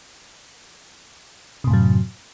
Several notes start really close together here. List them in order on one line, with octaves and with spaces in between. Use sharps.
C3 A2 F#2 F#3